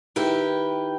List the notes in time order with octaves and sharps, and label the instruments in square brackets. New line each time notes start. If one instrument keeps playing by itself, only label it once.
[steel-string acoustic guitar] D#3 E4 G4 B4